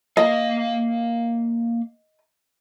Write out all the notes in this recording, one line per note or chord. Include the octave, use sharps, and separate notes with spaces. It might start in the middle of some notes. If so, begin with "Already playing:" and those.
A#3 D#5 F5